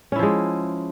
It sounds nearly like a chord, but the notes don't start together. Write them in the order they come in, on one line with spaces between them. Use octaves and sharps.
C#4 E4 F3 G#3